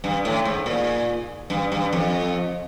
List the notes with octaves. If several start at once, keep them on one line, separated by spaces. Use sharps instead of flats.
G2
A2
G#2
A#2
G2
G2
F2